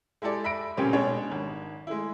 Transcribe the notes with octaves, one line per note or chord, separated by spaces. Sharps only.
G#3 E4 G4 A4 D5
E5 B5 A#6 D7
A#2 C#3 A3 C4 C#4 G4
B2 G#3 D4 G#4 C#5
G#1
G#3 A3 E4